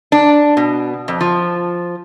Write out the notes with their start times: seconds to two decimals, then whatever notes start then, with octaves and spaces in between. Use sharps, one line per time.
0.12 D4
0.57 B2
1.08 F2
1.21 F3